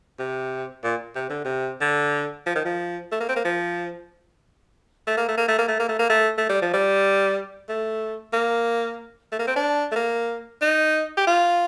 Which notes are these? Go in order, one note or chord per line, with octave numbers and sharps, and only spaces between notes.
C3
A#2
C3
D3
C3
D3
F3
D#3
F3
A3
A#3
C4
A#3
F3
A3
A#3
A3
A#3
A3
A#3
A3
A#3
A3
A#3
A3
A3
G3
F3
G3
A3
A#3
A3
A#3
C4
D4
A3
A#3
D#4
G4
F4